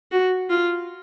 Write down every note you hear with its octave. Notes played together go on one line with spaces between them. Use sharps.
F#4
F4